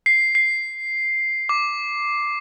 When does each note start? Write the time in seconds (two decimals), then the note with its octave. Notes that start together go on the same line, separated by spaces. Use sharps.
0.06 C7
0.35 C7
1.49 D6